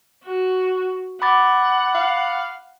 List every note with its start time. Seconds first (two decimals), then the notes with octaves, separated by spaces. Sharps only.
0.24 F#4
1.22 F#5 B5 D6 A6
1.95 F5